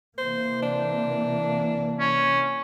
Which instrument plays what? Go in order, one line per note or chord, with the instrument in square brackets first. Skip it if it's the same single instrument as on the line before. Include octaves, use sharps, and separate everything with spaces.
[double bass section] C3 E3 A#3 [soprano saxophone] C5
[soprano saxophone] D4
[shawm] C#4